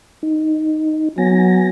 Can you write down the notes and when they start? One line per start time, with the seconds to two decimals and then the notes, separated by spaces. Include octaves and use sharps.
0.23 D#4
1.18 F#3 B3 G#5 A#6